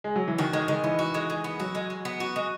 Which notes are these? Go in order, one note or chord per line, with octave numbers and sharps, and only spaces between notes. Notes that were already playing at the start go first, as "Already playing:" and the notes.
G#3
F#3
E3
D#3 F#4
D#3 G#3
D#3 G#3
E3 B3
F#4
G#3
G#3
B3
F#3 F#4
G#3
G#3
B3
F#4
G#3